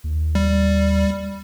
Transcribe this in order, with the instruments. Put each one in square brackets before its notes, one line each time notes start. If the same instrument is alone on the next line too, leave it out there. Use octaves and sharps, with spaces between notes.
[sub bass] D#2
[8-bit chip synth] G3